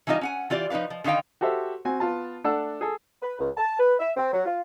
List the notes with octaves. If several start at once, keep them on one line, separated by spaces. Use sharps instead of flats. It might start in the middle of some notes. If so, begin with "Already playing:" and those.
E3 G3 D#4 F4 D#5
C#4 F#5 G#5
E3 F4 G4 D5
F3 D#4 G4 B4 F5
F3
D3 D#3 D#4 F5 G5
F#4 G4 A4 C5 E5
C4 F#4 G#5
B3 F4 A5
A3 D4 A4 F#5 A5 E6
G#4 A4
B4
C#2
A5
B4
E5
C4
F#3
F4